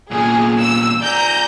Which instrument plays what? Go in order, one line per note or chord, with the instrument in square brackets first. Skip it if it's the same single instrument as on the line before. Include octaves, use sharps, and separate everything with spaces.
[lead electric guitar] E2 A#2 [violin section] G#4
[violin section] E6
[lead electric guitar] G#4 D5 [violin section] A#5 G6